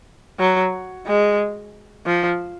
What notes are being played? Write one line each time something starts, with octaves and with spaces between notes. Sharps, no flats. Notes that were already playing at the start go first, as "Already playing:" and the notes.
F#3
G#3
F3